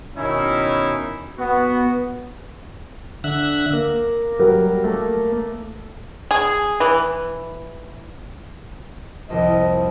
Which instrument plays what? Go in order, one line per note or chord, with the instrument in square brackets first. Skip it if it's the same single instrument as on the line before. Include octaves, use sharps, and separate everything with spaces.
[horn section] B2 D#3 C#4 D#4 E4
B3 F#4
[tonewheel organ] D3 E5 F#6
A#3
[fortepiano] F#3 G3 A#4
A3
[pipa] G#4
E3
[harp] C2 F2 [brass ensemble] D#5